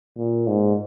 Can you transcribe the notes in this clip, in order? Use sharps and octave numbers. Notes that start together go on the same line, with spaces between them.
A#2
G#2